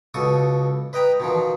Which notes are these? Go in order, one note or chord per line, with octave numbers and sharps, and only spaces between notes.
C#2 B2 A4 C#6 D#6
B4 D#5 G5 A#5
B2 D#3 F3